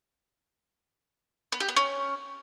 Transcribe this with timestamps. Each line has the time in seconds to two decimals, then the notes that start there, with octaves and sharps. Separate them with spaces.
1.52 B3
1.60 G4
1.68 B3
1.76 C#4